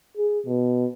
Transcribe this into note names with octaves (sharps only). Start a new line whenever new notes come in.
G#4
B2